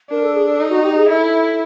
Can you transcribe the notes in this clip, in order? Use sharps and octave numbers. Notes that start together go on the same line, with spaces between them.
D4 A#4
A4
G#4
A4
D#4
F#4
G4
G#4
E4 A4